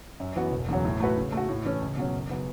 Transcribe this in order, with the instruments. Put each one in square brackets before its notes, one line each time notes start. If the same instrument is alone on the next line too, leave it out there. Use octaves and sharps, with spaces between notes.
[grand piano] F#2
E3 B3 F#4
E1
E2 C#3 F#3
A2
A3 F#4 B4
C#3
A3 F#4
A2
E3 C#4 A4
C#2
B2 F#3 C#4
F#1
C#3 F#3 B3